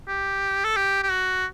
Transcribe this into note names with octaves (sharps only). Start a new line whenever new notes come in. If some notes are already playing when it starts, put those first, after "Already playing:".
G4
A4
G4
G4
F#4